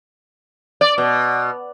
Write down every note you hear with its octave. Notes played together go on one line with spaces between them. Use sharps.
D5
B2